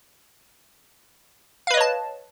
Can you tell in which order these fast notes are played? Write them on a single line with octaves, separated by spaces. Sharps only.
F5 B4 D#5 C#5 A5